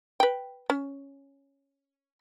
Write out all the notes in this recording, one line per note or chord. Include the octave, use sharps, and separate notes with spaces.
B4 G5
C#4